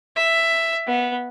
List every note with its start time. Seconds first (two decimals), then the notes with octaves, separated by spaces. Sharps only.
0.16 E5
0.87 B3